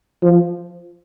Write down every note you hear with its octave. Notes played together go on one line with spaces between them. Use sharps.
F3